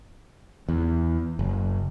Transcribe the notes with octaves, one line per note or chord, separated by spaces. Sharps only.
E2
F#1